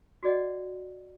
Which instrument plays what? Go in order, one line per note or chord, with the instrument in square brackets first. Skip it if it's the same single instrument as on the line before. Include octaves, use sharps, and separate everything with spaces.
[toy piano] F#4 G#4 D5 D#5 F#5